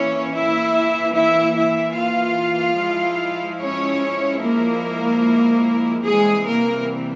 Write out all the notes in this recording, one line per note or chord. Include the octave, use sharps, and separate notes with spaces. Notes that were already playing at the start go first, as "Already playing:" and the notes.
Already playing: E3 A#3 C#4 E4 C#5
E4 E5
E4 E5
E4 E5
F4 F5
F3 G#3 E4
C#4 C#5
A#3 A#4
C3 E3 G3 G#3 C4 G#4
A#3 A#4